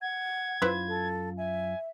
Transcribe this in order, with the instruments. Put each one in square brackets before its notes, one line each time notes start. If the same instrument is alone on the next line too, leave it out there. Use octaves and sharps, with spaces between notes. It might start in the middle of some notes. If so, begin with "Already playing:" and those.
[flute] F#5 [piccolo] G#6
[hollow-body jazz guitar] F#2 F4 [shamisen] E4 B4 C5
[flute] A4
[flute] E5 [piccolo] G#5